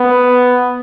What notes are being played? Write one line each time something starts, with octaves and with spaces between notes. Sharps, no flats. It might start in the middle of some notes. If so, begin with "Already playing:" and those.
Already playing: B3